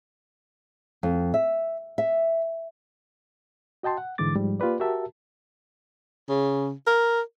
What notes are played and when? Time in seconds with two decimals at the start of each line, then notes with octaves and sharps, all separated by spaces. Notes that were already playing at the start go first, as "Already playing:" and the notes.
1.03 F2
1.34 E5
1.98 E5
3.83 F#4 D#5 G5 A5 C6
3.98 F#5
4.18 G#2 D3 E3 G#3 D6 A6
4.35 G#2 F3 G3
4.60 A#3 F4 G4 B4 D5
4.80 F#4 G4 A#4 E5 A5
6.29 C#3
6.87 A#4